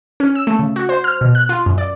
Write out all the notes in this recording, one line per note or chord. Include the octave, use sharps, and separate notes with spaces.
C#4
E6
A3
C#3
F#4
C5
F6
B2
F#6
F4
F#2
D5